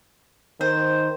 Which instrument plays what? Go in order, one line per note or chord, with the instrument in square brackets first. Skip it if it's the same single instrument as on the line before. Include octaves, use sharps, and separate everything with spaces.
[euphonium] D#3 [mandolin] C5